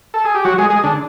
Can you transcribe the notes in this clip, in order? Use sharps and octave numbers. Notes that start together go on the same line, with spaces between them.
A4
G#4
G4
F#3 F#4
G#3 G#4
G#3 G#4
D3 D4